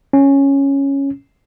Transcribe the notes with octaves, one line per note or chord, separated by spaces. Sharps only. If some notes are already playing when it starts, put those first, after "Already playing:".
C#4